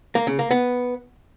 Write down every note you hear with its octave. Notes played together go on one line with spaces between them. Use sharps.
A#3
C#3
A#3
B3